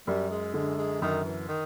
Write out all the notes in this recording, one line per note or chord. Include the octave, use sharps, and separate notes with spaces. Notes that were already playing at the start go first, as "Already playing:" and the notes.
F#2 G3
G#3
D3 G#3
G#3
F#2 D#3
E3
D#3